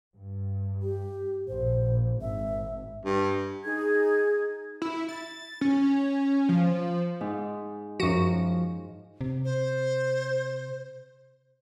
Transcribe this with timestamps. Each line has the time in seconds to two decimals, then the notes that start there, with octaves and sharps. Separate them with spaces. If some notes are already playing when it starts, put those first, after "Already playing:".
0.16 G2
0.82 G4
1.48 A#1 C5
2.21 G#1 E5
3.05 G2
3.64 D#4 G#4 G#6
4.82 E4
5.09 A6
5.61 C#4
6.49 F3
7.21 G#2
8.00 F#2 F3 F#4
9.21 C3
9.45 C5